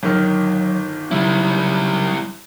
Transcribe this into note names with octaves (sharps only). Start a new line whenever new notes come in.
G1 D#3 F#3 F6
C#3 F#3 G3 E4